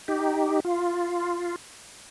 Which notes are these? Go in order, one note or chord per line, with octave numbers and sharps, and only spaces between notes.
D#4 G4
F4